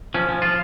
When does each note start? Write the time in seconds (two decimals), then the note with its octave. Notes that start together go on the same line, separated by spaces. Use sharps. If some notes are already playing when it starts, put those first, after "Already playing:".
0.14 F3 C#4
0.29 F3
0.42 F3 F4